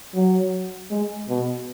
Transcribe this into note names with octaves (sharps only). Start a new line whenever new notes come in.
F#3
G#3
B2